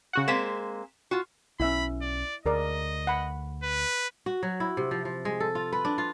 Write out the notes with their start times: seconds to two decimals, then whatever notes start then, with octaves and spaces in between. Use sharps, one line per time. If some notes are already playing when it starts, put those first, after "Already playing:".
0.13 C#3 F#4 F#5
0.28 G#3 A#3 C4 B6 E7
1.11 F4 F#4
1.60 B1 C#4 E4 E5 B5
2.02 D5
2.46 D2 G#4 A#4 D5 D#5
3.07 F#5 B5
3.63 B4
4.26 F#4
4.43 F#3
4.60 E4
4.77 C3
4.91 F3
5.05 F3
5.25 G#3
5.40 A4
5.55 F4
5.73 B4
5.85 D4
5.98 F4